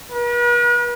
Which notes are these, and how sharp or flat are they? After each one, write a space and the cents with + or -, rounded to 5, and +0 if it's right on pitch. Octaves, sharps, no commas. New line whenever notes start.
B4 -45